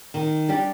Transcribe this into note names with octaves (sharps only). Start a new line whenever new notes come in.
D#3
G3 D4 G4